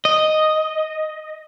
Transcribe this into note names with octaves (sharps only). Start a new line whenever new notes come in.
D#5